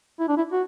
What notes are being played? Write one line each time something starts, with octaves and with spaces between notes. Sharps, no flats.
E4
D4
E4
F#4